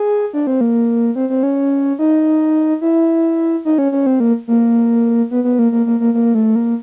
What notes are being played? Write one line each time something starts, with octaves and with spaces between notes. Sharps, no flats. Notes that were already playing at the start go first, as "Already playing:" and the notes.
Already playing: G#4
D4
C4
A#3
C4
C4
C#4
D#4
E4
D#4
C#4
C#4
C4
A#3
A#3
B3
B3
A#3
A#3
A#3
A#3
A#3
A3
A#3